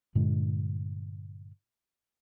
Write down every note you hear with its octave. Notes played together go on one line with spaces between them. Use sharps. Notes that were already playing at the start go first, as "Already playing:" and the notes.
G2 A#2 D3 G#3